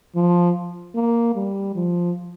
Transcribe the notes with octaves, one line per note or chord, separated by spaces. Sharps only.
F3
A#3
G3
F3